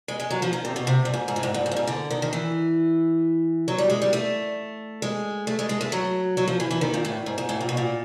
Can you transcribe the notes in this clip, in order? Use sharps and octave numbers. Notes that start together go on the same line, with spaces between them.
G#3
G#3
F#3
F3
D#3
C3
B2
C3
G2
G#2
G#2
A2
G#2
G2
G#2
G2
G#2
D3
D#3
D#3
E3
F#3
G3
G#3
G3
A3
G#3
A3
G#3
G#3
A3
F#3
F#3
F3
E3
E3
D#3
A#2
A2
G#2
G#2
A2
A#2
B2
A#2